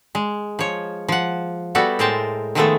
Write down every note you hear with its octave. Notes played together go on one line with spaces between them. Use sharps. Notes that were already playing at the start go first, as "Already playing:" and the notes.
G#3
F3 C#5
F3 F#5
G3 B3 F#4 A4 E5
A2 G#3 A#4 C5 G5 A5
D#3 F3 G#3 A3 B3 A4